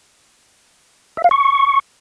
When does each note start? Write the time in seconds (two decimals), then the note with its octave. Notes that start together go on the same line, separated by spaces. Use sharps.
1.17 E5
1.24 F5
1.31 C#6